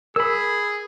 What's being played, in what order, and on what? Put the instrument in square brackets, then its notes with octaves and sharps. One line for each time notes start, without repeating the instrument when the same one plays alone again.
[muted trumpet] G#4 [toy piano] A#4 [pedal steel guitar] B5 E6